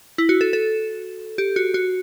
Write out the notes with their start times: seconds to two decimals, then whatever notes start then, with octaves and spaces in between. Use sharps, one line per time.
0.18 E4
0.29 F#4
0.41 A4
0.53 A4
1.38 G4
1.56 F#4
1.74 F#4